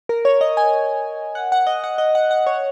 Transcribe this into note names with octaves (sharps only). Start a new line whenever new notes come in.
A#4
C#5
D#5
G#5
F#5
F#5
D#5
F#5
D#5
F#5
F#5
C#5